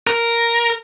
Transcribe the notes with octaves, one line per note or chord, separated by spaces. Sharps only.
A#4